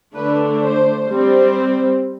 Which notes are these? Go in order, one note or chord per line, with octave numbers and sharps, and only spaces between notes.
D3 A3 D4 B4
C5
G3 C4